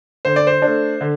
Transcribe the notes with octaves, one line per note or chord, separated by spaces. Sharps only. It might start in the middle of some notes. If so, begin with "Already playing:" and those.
D3 C5
D5
C5
D4
A3
D3